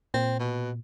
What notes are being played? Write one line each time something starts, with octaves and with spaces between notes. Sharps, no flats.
A#2 C4
B2